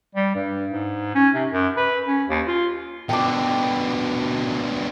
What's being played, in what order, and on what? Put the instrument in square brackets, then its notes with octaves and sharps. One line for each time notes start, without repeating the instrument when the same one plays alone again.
[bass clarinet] G3
G2
G#2
C#4
C3
F#2
B4
C#4
D#2
F4
[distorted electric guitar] B2 D3 [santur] G5 A5 D6